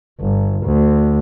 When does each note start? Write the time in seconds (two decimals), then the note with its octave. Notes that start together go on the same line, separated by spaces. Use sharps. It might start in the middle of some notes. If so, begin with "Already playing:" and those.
0.21 G1
0.64 D2